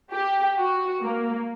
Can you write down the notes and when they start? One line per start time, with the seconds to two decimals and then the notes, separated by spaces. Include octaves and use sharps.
0.11 G4
0.57 F#4
1.02 A#3